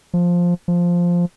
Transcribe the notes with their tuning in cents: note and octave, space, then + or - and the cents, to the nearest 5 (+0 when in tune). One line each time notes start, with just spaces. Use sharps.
F3 +5
F3 +0